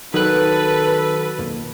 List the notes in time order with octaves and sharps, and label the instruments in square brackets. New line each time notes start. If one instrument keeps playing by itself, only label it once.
[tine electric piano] D#3 F#6 [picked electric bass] F#3 [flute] A4 [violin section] B4
[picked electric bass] B1 F2 A#3